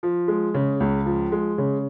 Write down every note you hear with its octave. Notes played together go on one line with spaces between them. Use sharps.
F3
G#3
C#3
C#2
F3
G#3
C#3